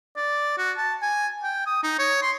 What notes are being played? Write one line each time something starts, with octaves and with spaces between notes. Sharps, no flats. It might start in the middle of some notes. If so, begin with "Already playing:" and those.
D5
F#4
A5
G#5
G5
D#6
D#4
C#5
C6